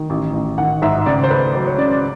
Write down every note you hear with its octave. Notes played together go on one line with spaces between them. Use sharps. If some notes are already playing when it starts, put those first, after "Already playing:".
Already playing: D#3
A1
A1
D#3 F#5
G#2 E5
C#2 D5
C5
A3 B4
F#3 C5
C#5
C#3 D5
D5